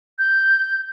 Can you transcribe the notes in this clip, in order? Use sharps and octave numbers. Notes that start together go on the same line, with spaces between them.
G6